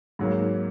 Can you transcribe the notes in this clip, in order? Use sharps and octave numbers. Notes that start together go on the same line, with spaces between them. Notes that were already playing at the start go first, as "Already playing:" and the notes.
G#2 F#3 A#3